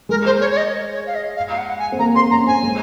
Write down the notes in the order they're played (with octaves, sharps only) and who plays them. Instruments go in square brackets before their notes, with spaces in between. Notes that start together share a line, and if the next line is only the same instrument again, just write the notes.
[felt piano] G#3 [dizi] A#4
[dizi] C5
C#5
C#5
D#5
C#5
F5
D#5
F5
F5
F#5
F#5
G#5
[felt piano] C4
[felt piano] A#3 [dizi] A#5
[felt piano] C4 [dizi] C6
[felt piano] C#4 [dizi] A#5
[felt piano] C4 [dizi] G#5
[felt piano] G#3